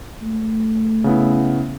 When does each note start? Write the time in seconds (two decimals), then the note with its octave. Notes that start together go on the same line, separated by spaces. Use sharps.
0.22 A3
1.04 C#3 B3 E4